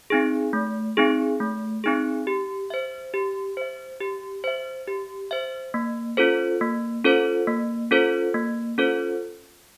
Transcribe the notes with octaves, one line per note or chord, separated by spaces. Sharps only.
C4 D#4 G#4
A3
C4 D#4 G#4
A3
C4 D#4 G#4
G4
C5 E5
G4
C5 E5
G4
C5 E5
G4
C5 E5
A#3
C#4 F4 A4 C5
A#3
C#4 F4 A4 C5
A#3
C#4 F4 A4 C5
A#3
C#4 F4 A4 C5